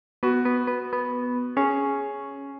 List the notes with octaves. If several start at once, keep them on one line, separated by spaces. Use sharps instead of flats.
B3 F#4
B3
B3
B3
C#4 G#4